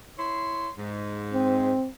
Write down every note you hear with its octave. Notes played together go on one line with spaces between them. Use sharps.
E4 C#5 C6
G#2
C4